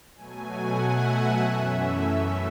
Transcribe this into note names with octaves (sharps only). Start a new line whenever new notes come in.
B2 F#3 A3 G#5
F#5
E5
E5
F#2 E3 A3 C#4 E5